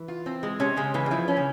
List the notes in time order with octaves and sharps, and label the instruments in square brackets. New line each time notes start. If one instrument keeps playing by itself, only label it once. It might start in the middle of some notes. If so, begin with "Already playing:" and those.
Already playing: [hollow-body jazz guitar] E3
[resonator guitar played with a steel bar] F4
C4
G#3
[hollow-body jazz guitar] C3 [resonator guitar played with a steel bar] C#4
[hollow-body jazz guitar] C#3 [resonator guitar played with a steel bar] G#3
[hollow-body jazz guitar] C#3 [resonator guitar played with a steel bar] E3
[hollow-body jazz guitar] G3
[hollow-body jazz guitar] F3 [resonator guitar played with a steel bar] E4
[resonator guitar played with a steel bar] C#4
[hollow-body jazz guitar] C#3